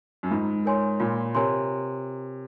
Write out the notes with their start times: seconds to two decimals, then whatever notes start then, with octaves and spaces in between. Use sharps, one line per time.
0.23 F#2
0.31 G#2 F4
0.65 A#4 C#5 G#5 C6
1.00 A#2 F4
1.35 C3 A#4 C#5 G#5 C6